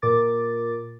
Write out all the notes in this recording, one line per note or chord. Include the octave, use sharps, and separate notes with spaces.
A#2 A#4 D6 A6